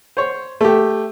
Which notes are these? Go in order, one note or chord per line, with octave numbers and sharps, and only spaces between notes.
C5 C#5
A3 G4